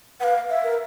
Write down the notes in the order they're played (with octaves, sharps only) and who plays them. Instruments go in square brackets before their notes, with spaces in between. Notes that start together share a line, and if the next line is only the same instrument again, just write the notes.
[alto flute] B4 [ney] F5 F#5
[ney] E5
[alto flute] A#4